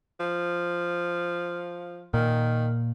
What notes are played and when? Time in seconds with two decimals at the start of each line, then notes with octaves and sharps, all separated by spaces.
0.20 F3
2.14 A#2 D#3